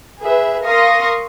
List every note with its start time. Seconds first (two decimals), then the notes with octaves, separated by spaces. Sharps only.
0.20 G#4 B4 E5
0.63 A#4 F5 C6 C#6 D#6 A#6